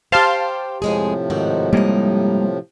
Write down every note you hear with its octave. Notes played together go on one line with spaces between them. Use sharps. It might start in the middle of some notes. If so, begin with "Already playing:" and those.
G4 C5 F5 A5 C6
F2 A2 C3 F3 G#3 G#4
G#2 D#3 F#4
G2 G3 G#3 A#3 D#4